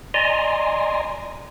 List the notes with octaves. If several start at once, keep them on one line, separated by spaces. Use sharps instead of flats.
D5 D#5 G#5 A#5 C6